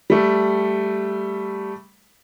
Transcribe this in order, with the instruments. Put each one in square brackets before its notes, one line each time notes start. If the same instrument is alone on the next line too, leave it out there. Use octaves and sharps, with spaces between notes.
[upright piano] G3 A3